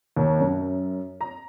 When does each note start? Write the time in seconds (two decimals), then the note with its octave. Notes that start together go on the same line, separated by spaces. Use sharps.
0.16 D#2
0.40 F#2
1.21 A#5